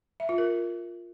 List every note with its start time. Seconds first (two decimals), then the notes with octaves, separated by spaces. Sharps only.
0.20 E5
0.29 F4
0.38 A#4